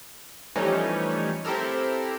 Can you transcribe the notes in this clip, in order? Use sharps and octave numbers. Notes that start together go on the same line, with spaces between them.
E3 F3 G3 A3 C#4 D#4
C4 E4 G4 A4 A#4